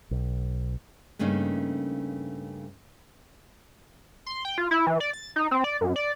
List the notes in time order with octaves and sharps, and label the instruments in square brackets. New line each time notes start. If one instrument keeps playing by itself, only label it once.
[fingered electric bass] B1
[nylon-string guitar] G2 C#3 A3 A#3 C#4 D#4
[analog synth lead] C6
G5
F4
E4
E3
D5
A6
D#4
C4
D5
F#2
D5